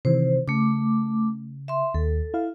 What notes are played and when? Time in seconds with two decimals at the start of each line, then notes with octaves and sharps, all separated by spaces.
0.05 C3 D#3 E3 C5
0.48 C#3 A3 D6
1.68 E5 C6
1.94 D#2 A4
2.34 E4 F5